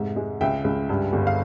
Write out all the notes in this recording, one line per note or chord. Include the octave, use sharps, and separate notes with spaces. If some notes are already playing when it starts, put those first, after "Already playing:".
Already playing: F1 G#2 E5
G#3
C#2 E5 G5
C#2
G2
G1
F5